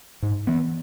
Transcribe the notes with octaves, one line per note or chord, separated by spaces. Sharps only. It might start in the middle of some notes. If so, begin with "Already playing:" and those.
G#2
E3 B3